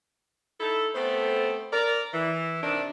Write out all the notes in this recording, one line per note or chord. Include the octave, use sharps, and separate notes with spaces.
D#4 E4 A4
A3 B3 C4 A4 C5
A#4 D5
E3
C3 D#3 D4